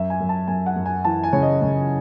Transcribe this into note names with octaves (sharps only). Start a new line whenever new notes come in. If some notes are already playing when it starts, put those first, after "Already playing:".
Already playing: F#2 E5
G#5
F#2
A5
F#2 G#5
F#5
F#2
G#5
E3 A5
G#5
C#3 C#5
D#5
C#3